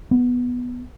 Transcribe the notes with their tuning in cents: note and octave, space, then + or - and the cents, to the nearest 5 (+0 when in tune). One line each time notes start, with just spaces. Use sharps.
B3 -5